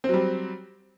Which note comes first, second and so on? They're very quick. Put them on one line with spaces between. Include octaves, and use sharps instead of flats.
C4 F#3 G3